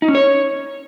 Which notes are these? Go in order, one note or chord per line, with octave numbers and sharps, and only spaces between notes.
D#4
C#4
C#5